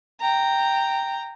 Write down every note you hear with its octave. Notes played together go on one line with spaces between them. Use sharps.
G5 A#5